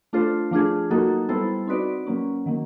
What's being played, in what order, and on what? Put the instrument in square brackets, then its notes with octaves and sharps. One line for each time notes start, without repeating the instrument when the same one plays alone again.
[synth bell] A3 D4 F4 A4 C5
F3 A3 D4 F4 G#4
F#3 A#3 D#4 F#4 A4
G3 B3 E4 A4 C5
C4 D#4 F#4 B4 D5
F#3 A#3 C#4
D#3 F#3 A#3